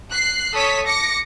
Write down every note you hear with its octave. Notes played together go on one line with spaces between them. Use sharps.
F#6 C7
A4 C#5 D#6 B6
D6 A#6 C#7